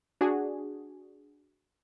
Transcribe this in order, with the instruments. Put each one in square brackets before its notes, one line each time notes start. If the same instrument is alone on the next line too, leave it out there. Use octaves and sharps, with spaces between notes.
[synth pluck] D4 F#4 G#4